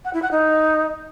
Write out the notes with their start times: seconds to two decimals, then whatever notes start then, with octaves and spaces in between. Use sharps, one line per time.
0.05 F#5
0.14 E4
0.22 F#5
0.31 D#4